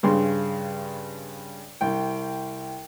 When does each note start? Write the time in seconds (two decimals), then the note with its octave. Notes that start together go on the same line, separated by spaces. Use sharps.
0.03 G2 C#3 C6
1.81 C2 G5